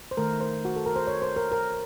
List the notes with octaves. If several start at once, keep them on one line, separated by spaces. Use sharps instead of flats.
C5
D#3 A3 A#4
C5
F#4
A4
A#4
C5
C#5
C5
A#4
A#4